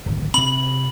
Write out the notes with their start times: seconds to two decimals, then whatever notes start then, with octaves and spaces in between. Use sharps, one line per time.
0.06 D1 G#1
0.34 C3 C4 B5 F#7